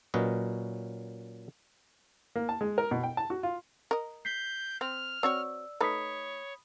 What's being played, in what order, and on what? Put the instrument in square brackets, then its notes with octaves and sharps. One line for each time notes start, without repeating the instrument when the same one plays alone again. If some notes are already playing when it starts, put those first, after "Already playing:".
[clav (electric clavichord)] A#2 F#3 C#4 B4 D#5
[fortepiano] A#3
A5
G#3
A#4
B2
G5
A5
F#4
F4
[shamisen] A#4 D#5
[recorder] G6 [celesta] B6 C7
[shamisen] C4 [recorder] F6
[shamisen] C4 F#4 C#5 [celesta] D5 E6
[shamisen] A3 D#4 B4 [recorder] C#5 [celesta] B5 D#6 B6